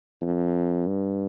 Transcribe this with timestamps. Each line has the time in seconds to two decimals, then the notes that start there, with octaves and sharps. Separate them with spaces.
0.22 F2
0.87 G2